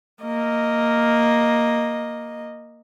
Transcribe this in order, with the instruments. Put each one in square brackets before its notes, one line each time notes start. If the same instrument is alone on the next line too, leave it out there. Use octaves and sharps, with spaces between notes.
[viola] A#3 D#5